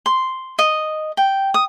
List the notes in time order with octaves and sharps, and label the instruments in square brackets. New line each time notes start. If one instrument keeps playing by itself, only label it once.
[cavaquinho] C6
D#5
G5
D#6